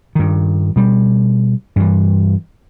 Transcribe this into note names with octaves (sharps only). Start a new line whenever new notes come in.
G2 D#3
B2 G3
G2 E3